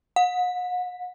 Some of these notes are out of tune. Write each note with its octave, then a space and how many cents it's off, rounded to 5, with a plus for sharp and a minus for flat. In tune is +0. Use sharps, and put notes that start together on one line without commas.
F#5 -40